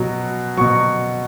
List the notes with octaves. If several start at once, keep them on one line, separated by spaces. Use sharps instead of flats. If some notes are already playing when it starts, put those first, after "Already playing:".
Already playing: B2 F#3
B2 F#3 C#6